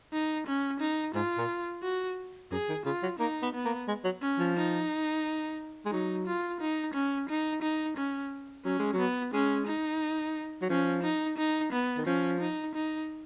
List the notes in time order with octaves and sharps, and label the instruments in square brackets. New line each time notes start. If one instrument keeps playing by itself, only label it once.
[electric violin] D#4
C#4
D#4
[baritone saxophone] G#2 [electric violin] F4
[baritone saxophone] A#2
[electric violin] F#4
[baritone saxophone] F#2 [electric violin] G#4
[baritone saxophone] D#3
[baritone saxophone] C#3 [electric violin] F4
[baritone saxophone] F#3
[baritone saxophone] A#3 [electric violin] D#4
[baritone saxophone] B3
[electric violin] B3
[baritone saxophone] A#3
G#3
F#3
[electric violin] C#4
[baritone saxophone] F3
[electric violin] D#4
[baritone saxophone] G#3
[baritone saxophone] F#3 [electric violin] D#4
[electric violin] F4
D#4
C#4
D#4
D#4
C#4
[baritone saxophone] F#3 [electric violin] C#4
[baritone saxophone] G#3
F#3
[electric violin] B3
[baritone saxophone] G#3 [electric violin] C#4
[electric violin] D#4
[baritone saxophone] F#3
[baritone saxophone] F3 [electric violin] C#4
[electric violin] D#4
D#4
B3
[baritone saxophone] D#3
[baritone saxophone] F3 [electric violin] C#4
[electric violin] D#4
D#4